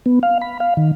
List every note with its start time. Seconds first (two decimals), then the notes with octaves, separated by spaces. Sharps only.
0.06 B3
0.23 F5
0.42 B5
0.60 F5
0.77 D#3